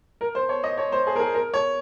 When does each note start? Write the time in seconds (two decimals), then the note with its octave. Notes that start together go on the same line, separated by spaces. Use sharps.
0.21 A#4
0.35 C5
0.49 C#5
0.64 D#5
0.78 C#5
0.92 C5
1.07 G#4
1.16 A#4
1.20 G#4
1.35 A#4
1.54 C#5